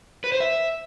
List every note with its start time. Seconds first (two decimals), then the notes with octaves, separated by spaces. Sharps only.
0.24 B4
0.32 C5
0.40 E5